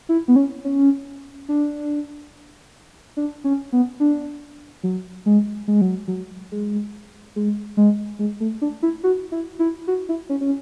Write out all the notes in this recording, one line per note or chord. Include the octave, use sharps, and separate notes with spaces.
E4
B3
C#4
C#4
D4
D4
C#4
B3
D4
F#3
G#3
G#3
F#3
F#3
G#3
G#3
G#3
G#3
A3
D4
E4
F#4
E4
E4
F#4
E4
C#4
C#4